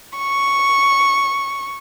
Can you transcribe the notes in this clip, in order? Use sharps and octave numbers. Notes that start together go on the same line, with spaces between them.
C#6